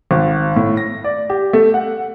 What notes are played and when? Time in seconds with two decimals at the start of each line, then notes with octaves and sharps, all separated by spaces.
0.11 G#1
0.56 A2
0.77 A#6
1.04 D5
1.30 G4
1.53 A3
1.74 F#5